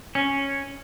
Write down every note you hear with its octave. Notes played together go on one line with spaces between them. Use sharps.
C#4